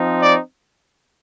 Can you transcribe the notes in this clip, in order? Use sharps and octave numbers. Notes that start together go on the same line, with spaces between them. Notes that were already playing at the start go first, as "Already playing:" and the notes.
Already playing: F3 C4 D#4
D5